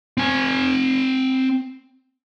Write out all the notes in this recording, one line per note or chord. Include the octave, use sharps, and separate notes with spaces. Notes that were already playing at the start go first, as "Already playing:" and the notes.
C4 G#5